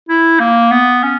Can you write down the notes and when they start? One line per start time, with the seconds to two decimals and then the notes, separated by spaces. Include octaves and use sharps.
0.09 E4
0.40 A#3
0.71 B3
1.03 C#4